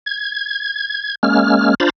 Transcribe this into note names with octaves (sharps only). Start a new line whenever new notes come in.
G#6
G#3 A#3 C#4 F6
D4 F4 C5 A#5 B5 A6